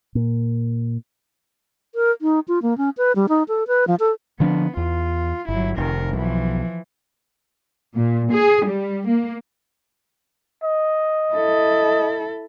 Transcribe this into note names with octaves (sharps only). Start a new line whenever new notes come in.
A#2
A#4
D#4
F4
A#3
C#4
B4
G3
D#4
A4
B4
F3
A4
D3 F3 B3 D4
E2 F4
G1 F#3 E4
F1 D#3 A#4
B1 E3 F3
A#2
G#4
G3
A#3
D#5
E4 A4